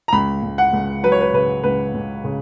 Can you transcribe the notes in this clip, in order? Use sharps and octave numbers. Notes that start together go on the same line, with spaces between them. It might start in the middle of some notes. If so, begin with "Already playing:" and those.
A#5
C#2 B5
C#2
F#5
C#2
F#3 B4
C#5
B4
C#3 B4
C#2 B4
C#2
C#3